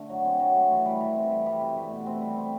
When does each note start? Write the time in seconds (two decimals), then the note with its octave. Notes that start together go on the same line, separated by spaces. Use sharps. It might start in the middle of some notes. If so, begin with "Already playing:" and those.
Already playing: D3 A3
0.09 F#3
0.25 C4
0.39 F#3
0.55 A3
0.71 E3
0.85 G3
1.00 E3
1.16 C4
1.31 G3
1.46 G3
1.61 C3
1.76 A3
1.91 B2
2.06 C4
2.21 G3
2.37 C4